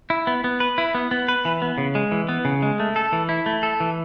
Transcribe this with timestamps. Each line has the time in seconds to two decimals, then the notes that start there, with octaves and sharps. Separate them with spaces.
0.10 E4
0.27 B3
0.44 B3
0.60 B4
0.78 E4
0.95 B3
1.11 B3
1.28 B4
1.45 E3
1.62 B3
1.78 C#3
1.95 G#3
2.12 E3
2.29 B3
2.45 C#3
2.62 G#3
2.80 A3
2.96 A4
3.12 E3
3.29 E4
3.46 A3
3.63 A4
3.80 E3